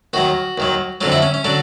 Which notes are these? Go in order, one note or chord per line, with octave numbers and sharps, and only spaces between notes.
D#2 D#3 F#3 F#4
D#2 D#3 F#3
F2 D3 F#3 F4
E4
C#4
C#4
D3 F#3 D4